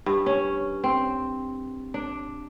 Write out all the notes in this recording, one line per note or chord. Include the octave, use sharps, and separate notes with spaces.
G2
C#4
C4
D4